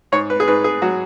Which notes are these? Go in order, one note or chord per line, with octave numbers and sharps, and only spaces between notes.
G#2 C#5
B4
G#4
G#2 B4
G#4
F#3 F#4